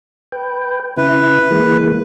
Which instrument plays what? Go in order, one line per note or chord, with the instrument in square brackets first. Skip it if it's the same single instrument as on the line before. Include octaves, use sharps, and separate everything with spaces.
[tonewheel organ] B4 G5
[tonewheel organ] C#3 E4 [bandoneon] B4
[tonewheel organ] E3 G#3 A#3